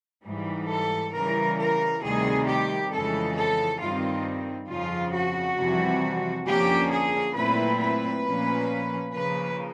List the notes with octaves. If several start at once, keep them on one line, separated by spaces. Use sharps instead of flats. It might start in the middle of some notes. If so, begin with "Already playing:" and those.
G#2 E3 G3
A4
C#3 E3 G3 A#4
A#4
D2 C3 D#3 G3 G#4
G4
F2 C#3 E3 G#3 A4
A4
G2 D#3 G3 C4 F4
F2 C#3 F3 F4
F#4
F2 C3 E3 G3
F2 D3 F3 A#3 C#4 G4
G#4
A#2 F#3 A3 C4 E4 B4
B4
A#2 F3 A#3 C#4
C#3 F3 A#3 B4